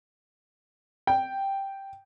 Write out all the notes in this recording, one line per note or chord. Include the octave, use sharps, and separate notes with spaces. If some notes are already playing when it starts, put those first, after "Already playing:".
G5